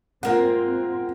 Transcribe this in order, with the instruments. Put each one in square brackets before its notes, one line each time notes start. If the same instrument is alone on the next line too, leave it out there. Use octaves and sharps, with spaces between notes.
[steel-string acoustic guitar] G#3 A#3 F4 [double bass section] C4 [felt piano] A#4 F#5